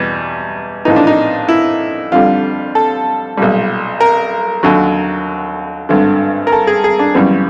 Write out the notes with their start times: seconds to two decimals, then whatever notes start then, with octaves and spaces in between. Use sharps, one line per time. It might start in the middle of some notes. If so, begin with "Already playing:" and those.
Already playing: E2 B2 G3
0.85 A#1 A2 E3 D#4
0.96 D4
1.07 D#4
1.49 E4
2.12 F2 D3 G3 F4
2.75 A4
3.37 B1 A#2 G3
4.01 A#4
4.63 D#2 D3 F#3
5.89 G#1 G2 D3
6.47 A#4
6.52 A4
6.67 G#4
6.84 G#4
6.99 D4
7.14 F#2 C#3 E3 G3 B3